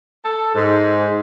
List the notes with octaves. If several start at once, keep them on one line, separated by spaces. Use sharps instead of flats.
A4
G#2